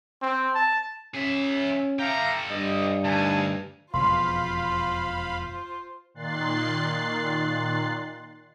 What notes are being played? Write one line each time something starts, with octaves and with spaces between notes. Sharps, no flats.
C4
A5
C#4 G#4 E5
G4 A4 E5 F5 A#5
G2 D#5
D2 D#4 G#5 A5
E1 F2 B2 F4 C5 F5 B5 C6
A#2 D#3 C6 F#6 A6 C7